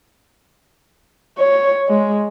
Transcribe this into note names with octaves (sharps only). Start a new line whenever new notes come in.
C#5
G#3